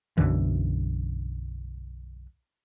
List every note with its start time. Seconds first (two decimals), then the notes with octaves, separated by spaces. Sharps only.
0.18 B1 F#2 D3 E3